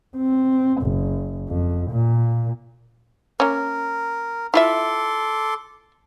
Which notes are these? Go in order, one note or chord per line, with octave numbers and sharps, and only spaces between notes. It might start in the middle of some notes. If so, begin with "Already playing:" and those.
C4
F#1
F2
A#2
A#3 C#4 A#4
E4 F4 A4 E5 C6 D6